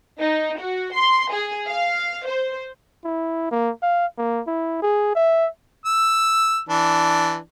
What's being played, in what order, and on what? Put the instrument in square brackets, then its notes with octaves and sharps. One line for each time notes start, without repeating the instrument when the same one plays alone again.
[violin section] D#4
F#4
C6
G#4
F5
C5
[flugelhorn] E4
A#3
F5
A#3
E4
G#4
E5
[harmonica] E6
E3 D4